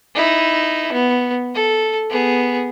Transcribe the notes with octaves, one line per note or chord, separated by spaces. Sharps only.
D#4 E4
B3
A4
B3 G#4